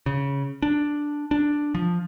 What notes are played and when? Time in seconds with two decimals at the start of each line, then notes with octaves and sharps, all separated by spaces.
0.06 C#3
0.62 D4
1.31 D4
1.75 F3